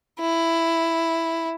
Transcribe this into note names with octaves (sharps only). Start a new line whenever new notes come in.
E4